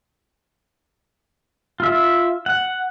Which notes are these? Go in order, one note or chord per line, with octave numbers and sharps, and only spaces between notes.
F4 E5
F#5